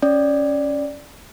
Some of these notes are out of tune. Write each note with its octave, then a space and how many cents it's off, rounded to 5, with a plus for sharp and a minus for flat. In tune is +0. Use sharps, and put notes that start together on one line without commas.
C#4 +0 D5 +0